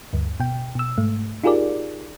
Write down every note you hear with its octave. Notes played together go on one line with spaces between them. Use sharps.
D2 G2
B2 G5
B2 E6
G#2 A3
D#4 F4 G4 G#4 A#4 D5